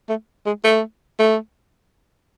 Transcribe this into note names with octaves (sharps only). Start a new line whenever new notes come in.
A3
G#3
A3
A3